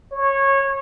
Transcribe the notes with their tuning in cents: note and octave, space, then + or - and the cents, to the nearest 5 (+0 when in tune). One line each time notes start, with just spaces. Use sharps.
C#5 -20